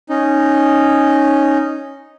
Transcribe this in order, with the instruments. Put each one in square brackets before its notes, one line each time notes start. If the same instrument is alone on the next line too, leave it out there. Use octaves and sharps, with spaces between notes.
[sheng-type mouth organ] C#4 D#4